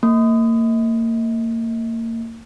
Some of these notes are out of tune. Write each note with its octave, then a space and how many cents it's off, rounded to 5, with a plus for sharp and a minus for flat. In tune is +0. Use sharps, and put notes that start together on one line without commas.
A#3 -35